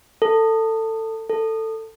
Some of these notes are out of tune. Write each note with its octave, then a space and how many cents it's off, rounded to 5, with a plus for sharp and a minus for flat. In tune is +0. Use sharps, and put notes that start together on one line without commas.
A4 +20
A4 +15